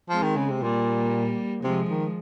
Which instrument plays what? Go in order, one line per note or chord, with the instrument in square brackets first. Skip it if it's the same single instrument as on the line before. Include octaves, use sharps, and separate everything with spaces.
[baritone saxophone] F3 [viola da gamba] G#3 C4
[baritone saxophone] D#3
C#3
C3
[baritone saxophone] A#2 [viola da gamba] G3 A#3
[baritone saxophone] C3 [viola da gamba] F3 G#3
[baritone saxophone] D#3